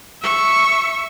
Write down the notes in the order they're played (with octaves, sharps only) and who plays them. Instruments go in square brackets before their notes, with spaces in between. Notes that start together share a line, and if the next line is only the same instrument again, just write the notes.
[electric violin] E5 C#6